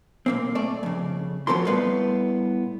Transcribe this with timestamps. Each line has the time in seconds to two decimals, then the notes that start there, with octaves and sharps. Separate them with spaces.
0.26 B1 A#3 C4
0.55 A3 D5
0.83 F2 C#3
1.47 F3 F#3 C4 A4 A#4 C6
1.67 A2 G3 B3 B4 F5